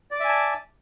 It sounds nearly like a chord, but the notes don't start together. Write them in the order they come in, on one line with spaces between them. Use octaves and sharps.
D5 D6 E5 G#5 A5